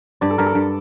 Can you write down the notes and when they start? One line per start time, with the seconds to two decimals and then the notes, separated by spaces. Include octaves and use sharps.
0.21 G2 D5
0.30 A4
0.38 G2 A#4
0.46 A4
0.55 G2